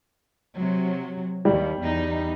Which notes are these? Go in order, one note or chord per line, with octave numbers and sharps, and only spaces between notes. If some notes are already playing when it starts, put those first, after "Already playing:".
C3 F#3
D#2 G3
E2 D#4